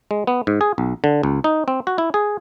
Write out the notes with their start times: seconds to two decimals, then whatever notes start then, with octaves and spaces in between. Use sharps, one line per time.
0.11 G#3
0.27 B3
0.47 G#2
0.61 G#4
0.78 B1
1.04 D3
1.23 C#2
1.44 D#4
1.68 C4
1.87 F#4
1.98 E4
2.14 G#4